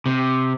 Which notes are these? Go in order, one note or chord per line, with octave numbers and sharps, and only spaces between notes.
C3